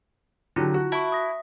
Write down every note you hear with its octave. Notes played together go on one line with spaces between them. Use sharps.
D3 F#3 E4 F4 G4
F#4
E4 A5 C#6
D#6 A#6